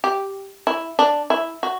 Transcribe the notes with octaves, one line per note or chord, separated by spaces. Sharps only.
G4
E4
D4
E4
F#4